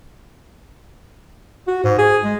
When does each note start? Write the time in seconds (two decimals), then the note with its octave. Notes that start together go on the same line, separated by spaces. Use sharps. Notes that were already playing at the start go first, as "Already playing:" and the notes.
1.68 F#4
1.84 G#2
1.98 G#4
2.24 G#3